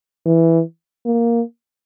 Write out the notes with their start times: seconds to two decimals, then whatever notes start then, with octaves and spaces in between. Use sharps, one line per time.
0.26 E3
1.06 A#3